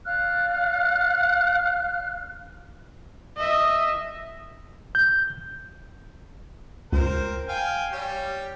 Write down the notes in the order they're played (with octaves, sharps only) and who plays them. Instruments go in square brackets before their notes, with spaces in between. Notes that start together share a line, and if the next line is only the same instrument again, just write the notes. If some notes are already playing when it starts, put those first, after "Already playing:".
[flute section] D5 F5 F6 F#6
[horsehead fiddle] D#5 E5
[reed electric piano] G6
[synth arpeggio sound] C#2 [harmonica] C4 A#4 C5
[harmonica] F5 G5 G#5
G3 G4 C#5